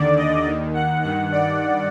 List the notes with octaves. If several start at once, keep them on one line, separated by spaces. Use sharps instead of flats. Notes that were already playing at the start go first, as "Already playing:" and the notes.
Already playing: D#2 D3 D5
D#5
D#2 D#3
F#5
G2 D#3 F#5
D5